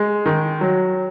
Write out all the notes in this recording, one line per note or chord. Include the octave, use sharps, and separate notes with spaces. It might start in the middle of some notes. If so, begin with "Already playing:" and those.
Already playing: G#3
D#3
F#3